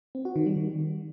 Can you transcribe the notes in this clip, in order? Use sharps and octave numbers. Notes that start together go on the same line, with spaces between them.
C4
F#4
D#3
G3
D#3